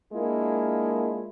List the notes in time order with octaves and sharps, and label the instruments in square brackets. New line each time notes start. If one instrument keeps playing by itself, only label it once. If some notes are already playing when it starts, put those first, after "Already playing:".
[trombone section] G#3 A#3 D4 E4 F4 A#4